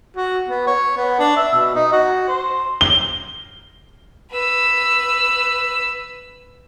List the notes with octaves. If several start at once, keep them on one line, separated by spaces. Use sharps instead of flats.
F#4
B3
C#5
B3
D4
E5
B2
D#4
F#4
C5
G7
B4 E6